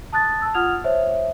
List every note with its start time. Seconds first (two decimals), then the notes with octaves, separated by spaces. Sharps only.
0.13 A5 D#6 F#6 A6
0.42 A5 E6
0.54 F4 F#5 D#6 F6 G#6 F7
0.84 C5 C#5 E5